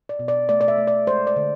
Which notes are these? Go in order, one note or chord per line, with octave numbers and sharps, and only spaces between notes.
D5
B2
D5
A3 D5
D5
E5
A3
D5
G#3 C5
D5
D3